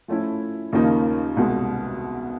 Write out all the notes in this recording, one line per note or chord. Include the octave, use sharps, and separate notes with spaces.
F3 A3 C#4 E4
D#2 C#3 F3 A#3 D#4
C2 B2 G#3